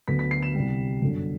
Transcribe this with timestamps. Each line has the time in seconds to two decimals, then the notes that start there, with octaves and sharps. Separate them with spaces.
0.08 D2 D3 F#3 B3 B6
0.19 B6
0.31 C7
0.42 E7
0.55 C2 C3 G3
1.02 G1 F#2 D3